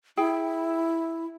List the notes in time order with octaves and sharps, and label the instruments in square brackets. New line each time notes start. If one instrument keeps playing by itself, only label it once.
[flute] E4 [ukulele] G#4 G5